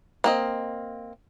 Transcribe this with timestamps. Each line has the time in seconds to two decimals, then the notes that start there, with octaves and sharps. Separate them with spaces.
0.24 A#3 C4 D#5